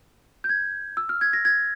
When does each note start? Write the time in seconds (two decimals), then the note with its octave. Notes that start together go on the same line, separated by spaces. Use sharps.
0.44 G6
0.49 G#6
0.97 E6
1.09 F6
1.21 G#6
1.33 A#6
1.45 G#6